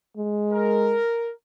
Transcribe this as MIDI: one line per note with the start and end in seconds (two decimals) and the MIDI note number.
0.17 0.98 56
0.52 1.31 70